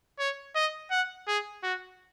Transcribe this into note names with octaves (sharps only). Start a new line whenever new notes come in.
C#5
D#5
F#5
G#4
F#4